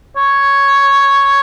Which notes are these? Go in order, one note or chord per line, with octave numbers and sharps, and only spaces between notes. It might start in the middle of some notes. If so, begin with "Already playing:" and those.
C#5